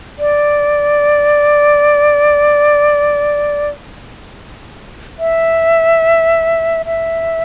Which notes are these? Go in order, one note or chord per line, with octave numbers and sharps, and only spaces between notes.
D5
E5
E5